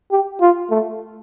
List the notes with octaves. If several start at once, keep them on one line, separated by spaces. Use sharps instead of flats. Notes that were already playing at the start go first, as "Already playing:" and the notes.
G4
F4
A3